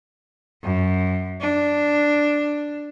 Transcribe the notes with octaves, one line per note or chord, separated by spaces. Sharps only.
F#2
D4